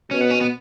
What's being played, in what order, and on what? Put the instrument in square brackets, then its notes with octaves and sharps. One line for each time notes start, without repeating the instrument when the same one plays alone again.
[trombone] B2 [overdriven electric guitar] C#4
[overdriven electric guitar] B3
C#4
B3